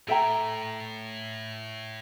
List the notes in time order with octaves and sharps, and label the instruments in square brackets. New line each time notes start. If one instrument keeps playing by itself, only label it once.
[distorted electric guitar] A2 [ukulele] A4 E5 G5 A#5